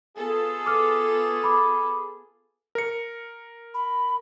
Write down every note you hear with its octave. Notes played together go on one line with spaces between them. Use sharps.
B3 F4 G#4 A4
D6 F6
B5 D6
A#4 C#7
B5